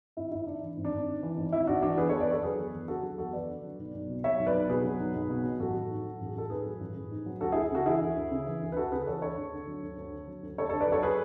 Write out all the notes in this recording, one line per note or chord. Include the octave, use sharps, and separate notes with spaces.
G#1 E4
G#1 E4
G#2 D4
E3
G#1
D4
G#1
G#2
E3
G#1
G#1 E4
G#2 D4 F#4
E3 D4 F#4
E2 G#4 B4
E2 A4 C#5
B4 D5
D3 A4 C#5
F#3 G#4 B4
E2
E2
D3 F#4 A4
F#3
E2 F#4 A4
E2 B4 D5
D3
F#3
B1
B1
B2
F#3 C#5 E5
B1
B4 D5
B1
B2 G#4 B4
F#3
B1
B1
B2
F#3
A1 F#4 A4
A1
G#2
F#3
A1
G#4
A1 A4
G#2 G#4 B4
F#3
A1
A1
G#2
F#3
D2 F#4 A4
D2 E4 G#4
C#3 F#4 A4
E3 E4 G#4
D2
D2
C#3
E3
D2
B4
D2 F#4 A4
C#3 G#4 B4
E3 A4 C#5
D2 A4 C#5
D2
D3
F#3
D2
D2
D3
F#3
D2
D2 A4 C#5
D3 A4 C#5
B4 D5
F#3 A4 C#5
G#4 B4